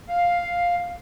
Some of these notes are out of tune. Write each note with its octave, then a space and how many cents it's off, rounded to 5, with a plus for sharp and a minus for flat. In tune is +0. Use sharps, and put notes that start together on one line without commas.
F5 +5